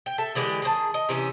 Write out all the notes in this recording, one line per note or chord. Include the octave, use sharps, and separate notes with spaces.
G5
A4 E5 A5
D3 E3 G#3 G4
D#3 G#4 C5 A5
D#5
C3 E3 C#4